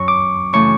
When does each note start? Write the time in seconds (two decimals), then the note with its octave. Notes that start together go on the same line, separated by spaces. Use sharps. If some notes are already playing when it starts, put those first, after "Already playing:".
Already playing: F#3 C#4 F#4 C#6
0.08 D6
0.53 C#3 E3 A3 C#6